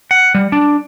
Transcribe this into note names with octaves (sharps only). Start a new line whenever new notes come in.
F#5
G3
D4